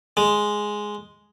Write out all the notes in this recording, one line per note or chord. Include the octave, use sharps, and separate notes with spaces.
G#3